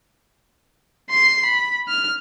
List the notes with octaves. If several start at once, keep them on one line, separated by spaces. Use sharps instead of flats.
C6 C7
B5
F6